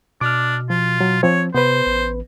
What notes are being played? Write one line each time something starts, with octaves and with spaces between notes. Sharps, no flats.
B2 D4 D6 F6
F3 F4
F#3
F3 C4 C#5
C3 B3 B4 C5
A1